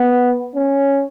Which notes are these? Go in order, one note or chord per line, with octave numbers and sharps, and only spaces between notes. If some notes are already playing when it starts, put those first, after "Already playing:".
Already playing: B3
C#4